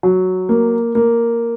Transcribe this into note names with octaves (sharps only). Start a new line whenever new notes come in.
F#3
A#3
A#3